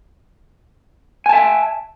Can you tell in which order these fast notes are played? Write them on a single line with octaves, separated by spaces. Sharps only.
G#5 A5 E5